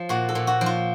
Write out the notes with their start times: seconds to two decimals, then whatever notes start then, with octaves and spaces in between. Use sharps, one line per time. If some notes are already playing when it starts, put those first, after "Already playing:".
Already playing: F3
0.09 A#2 F#4
0.29 A4
0.35 A#2
0.47 F#4
0.61 F3
0.66 F4